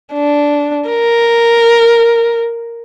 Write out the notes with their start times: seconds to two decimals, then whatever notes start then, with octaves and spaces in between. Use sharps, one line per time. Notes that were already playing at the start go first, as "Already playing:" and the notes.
0.14 D4
0.90 A#4